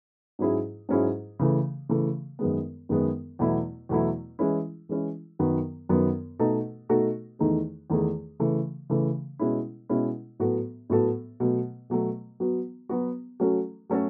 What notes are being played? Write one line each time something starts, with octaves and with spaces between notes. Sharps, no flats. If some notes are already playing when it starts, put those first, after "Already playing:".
G#2 F#3 C#4 E4 G#4
G#2 F#3 C#4 E4 G#4
C#3 E3 A3
C#3 E3 A3
F#2 D#3 G#3 B3
F#2 D#3 G#3 B3
E2 B2 F#3 A3 E4
E2 B2 F#3 A3 E4
E3 G#3 C#4 E4
E3 G#3 C#4 E4
F#2 D#3 F#3 B3 F#4
F#2 D#3 F#3 B3 F#4
B2 A3 D#4 F#4 A4
B2 A3 D#4 F#4 A4
E2 D#3 A3 D#4 G#4
E2 D#3 A3 D#4 G#4
C#3 E3 A3
C#3 E3 A3
B2 G#3 C#4 E4
B2 G#3 C#4 E4
A2 F#3 B3 F#4 A4
A2 F#3 B3 F#4 A4
B2 F#3 A3
B2 F#3 A3
F#3 B3 F#4
F#3 B3 F#4
F#3 A3 C#4 F#4 A4
F#3 A3 C#4 F#4 A4